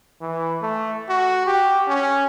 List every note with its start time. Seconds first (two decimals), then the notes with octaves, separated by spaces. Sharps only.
0.21 E3
0.62 A3
1.09 F#4
1.47 G4
1.88 C#4